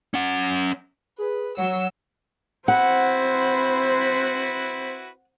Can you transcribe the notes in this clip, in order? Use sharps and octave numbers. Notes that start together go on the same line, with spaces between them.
C#4 F#5
G#4 B4
F#3 C#5 F#5 E6
C4 E4 F#4 B4 C5 F#5